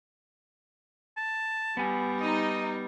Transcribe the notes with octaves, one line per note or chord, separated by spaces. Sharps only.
A5
G3 B3 G#5
D#4 D#5